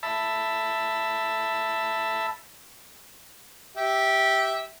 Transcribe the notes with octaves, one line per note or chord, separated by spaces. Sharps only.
E5 A5 B5
G4 E5